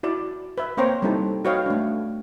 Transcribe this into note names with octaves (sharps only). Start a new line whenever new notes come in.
E4 F#4 D5
B4 E5
A#3 C4 C5 C#5 G5 A#5
G3 C4 D#4 E4 A4
F#4 B4 C#5 D#5 F5 G5
A3 D4